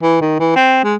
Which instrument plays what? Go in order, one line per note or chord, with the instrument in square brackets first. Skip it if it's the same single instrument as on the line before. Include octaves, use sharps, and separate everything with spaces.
[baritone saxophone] E3
D#3
E3
C4
G#3